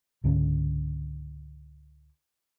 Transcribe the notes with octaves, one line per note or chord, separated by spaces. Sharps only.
C#2 G#2 D3 C#4